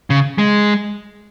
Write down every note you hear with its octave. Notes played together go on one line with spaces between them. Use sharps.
C#3
G#3